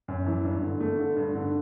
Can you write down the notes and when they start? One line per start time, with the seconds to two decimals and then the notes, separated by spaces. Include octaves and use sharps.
0.08 F#2
0.26 E3
0.45 G2
0.63 D3
0.80 A3
0.99 D3
1.17 G2
1.35 D3